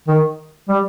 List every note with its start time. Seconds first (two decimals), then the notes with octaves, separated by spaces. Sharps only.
0.08 D#3
0.69 G3